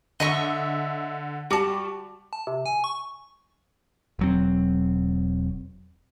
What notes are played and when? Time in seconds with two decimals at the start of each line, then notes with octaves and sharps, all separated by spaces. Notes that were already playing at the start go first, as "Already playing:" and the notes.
0.20 D3 D#5 E5 C#6
1.51 G3 F#4 A5 D6
2.33 A5
2.47 C3
2.66 G#5
2.84 C#6
4.19 E1 F#3 C4